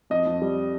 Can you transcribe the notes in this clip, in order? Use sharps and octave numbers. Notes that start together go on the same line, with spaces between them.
F2 D#5
F2
G3